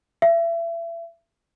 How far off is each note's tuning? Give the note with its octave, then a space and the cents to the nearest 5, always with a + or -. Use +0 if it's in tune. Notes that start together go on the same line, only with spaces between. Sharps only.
E5 +35